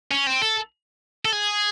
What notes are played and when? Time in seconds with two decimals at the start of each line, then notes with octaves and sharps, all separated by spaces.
0.11 C#4
0.27 C4
0.42 A4
1.25 A4
1.33 G#4